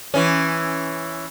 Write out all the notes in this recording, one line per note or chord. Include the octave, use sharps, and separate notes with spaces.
E3 C#4